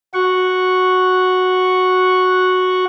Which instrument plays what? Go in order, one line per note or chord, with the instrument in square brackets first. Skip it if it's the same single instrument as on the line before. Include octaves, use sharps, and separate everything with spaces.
[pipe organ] F#4 F#5 C#6